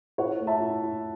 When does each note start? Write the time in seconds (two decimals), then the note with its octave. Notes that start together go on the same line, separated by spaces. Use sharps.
0.18 E4 C#5 F#5
0.40 A3
0.47 E5 A5
0.60 E4
0.82 E4